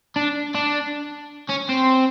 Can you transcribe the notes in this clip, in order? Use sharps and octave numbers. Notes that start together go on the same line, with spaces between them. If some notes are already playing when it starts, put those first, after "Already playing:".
D4
D4
C#4
C4